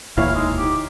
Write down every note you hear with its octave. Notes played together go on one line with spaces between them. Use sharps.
E1 D2 A#2 E3 E4 C#5 F5
G#3 D#4
D#4 G4